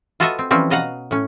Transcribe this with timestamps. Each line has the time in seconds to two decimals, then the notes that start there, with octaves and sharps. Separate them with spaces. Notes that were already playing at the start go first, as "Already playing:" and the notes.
0.20 F4 F#4 A4 B4 D#5 E5
0.39 C4
0.51 E3 F3 G3 C4 C#4
0.70 B2 D#5 F5 F#5 A#5
1.11 A2 C#4